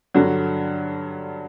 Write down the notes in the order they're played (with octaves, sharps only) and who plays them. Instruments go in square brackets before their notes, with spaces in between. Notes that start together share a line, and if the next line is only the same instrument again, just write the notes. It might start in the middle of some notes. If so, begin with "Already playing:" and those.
[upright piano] G2 D3 F#3